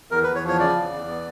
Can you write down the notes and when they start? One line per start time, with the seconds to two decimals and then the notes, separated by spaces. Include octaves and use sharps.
0.11 E2 A#4
0.23 B4
0.28 E2
0.35 C#5
0.43 F3
0.48 C#5
0.60 C#3 D5
0.76 E2
0.93 E2
1.08 B3